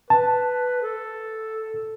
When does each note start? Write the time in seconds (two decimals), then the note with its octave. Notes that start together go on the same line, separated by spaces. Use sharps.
0.10 B4 A5
0.82 A4